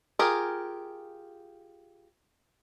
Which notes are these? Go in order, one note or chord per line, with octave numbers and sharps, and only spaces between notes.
F4 G4 G#4 A#4